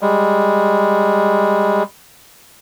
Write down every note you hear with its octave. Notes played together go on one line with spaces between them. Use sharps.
G3 G#3